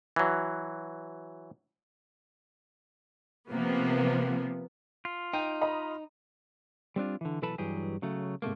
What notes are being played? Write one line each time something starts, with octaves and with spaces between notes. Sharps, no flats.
E3 F#3
C3 F3 A#3 B3
F4
D#4 G5
D#5 A#5 B5
G3 C4 D4 F4
D3 E3
B1 E3 A4 B4 A5 B5
G2 E3 F#3 G4 G#4
C#3 F#3 A3
G#2 C3 A3 A#3